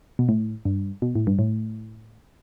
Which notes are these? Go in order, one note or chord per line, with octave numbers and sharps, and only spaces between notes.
B2
A2
G2
B2
A2
G2
A2